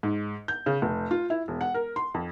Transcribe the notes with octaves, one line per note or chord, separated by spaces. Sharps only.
G#2
G6
C#3
F1
F4
E4
E1
F#5
A#4
C6
F2